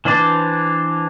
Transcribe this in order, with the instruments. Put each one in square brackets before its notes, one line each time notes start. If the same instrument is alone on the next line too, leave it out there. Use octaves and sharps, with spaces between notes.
[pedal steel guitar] E3 D4 C5 D5